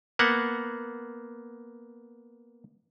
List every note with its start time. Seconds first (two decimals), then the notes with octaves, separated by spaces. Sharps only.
0.19 A#3 B3 F#5